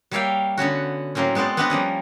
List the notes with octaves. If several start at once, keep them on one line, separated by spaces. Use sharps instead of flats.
G3 A#3 C#5 E5 F5 G5
D3 B3 C#4 F#4
A2 F#3 A#3 C4 C#4
G#3 B3 C4 C5 D5
B3 C4 D4 B4 D#5 F#5
F3 G3 A#3 C#4